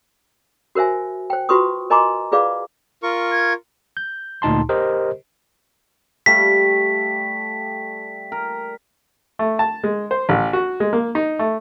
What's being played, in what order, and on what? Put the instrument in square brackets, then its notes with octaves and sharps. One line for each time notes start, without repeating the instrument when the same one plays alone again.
[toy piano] F#4 A#4 C5 E5 G#5
C5 G5
F4 F#4 B4 C6 C#6 D#6
A#4 D#5 G#5 A#5 C6 D6
F4 G#4 B4 D5 F5 D6
[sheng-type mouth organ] F4 A#4 C#6
[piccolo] G#6
[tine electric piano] G6
D2 A#2 D#4 A5 C6
G4 A#4 C5 D#5
[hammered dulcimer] G3 A3 F5 [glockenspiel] B6
[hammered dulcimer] A#4
[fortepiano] A3
A5
G#3
C5
A1
F#4
G#3
A#3
D#4
A3